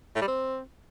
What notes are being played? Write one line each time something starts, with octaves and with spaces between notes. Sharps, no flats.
A2
G3
C4